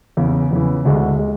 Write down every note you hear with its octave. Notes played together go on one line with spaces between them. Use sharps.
E2 C#3 E3
E2 C#3 E3
D2 D3 G#3
G#3